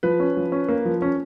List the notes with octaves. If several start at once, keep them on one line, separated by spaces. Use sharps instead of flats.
F3 B4
C#4
F3
C#4
A#3
F3
C#4